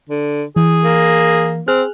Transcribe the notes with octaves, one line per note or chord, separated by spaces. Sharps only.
D3
E3 G#4
A#3
C4 G#4 F6 F#6